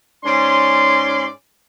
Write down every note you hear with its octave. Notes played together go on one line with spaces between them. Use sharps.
G#2 C#4 D5 C6